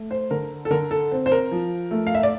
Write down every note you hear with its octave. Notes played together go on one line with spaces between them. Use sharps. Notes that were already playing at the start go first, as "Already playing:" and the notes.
Already playing: A3
C5
D3 A#4
A4
D3 A#4
A4
C4
C5
A#4
F3
A3
F5
E5
D5